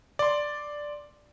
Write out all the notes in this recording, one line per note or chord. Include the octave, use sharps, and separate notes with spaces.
D5 C6